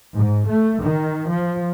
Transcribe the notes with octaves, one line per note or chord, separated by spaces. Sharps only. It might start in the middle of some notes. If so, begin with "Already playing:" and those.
G#2
A3
D#3
F3